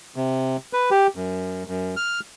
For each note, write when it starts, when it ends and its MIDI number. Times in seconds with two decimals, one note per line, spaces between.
0.16 0.57 48
0.73 0.90 71
0.91 1.07 67
1.16 1.63 42
1.67 1.95 42
1.96 2.20 89